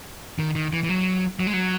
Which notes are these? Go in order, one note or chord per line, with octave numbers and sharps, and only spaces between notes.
D#3
D#3
E3
E3
F#3
F#3
G#3
F#3